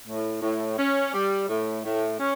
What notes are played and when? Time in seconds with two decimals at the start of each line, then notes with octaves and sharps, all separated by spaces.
0.07 A2
0.42 A2
0.78 C#4
1.13 G3
1.49 A2
1.84 A2
2.19 C#4